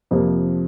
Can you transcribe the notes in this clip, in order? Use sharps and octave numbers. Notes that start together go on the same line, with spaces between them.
F2 C3 F3 A#3